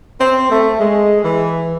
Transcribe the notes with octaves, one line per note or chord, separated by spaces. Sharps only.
C4
A3
G#3
E3